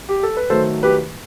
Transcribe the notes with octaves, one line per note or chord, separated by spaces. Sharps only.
G4
A4
B4
D#3 F#3 A3 A4 C5
G4 B4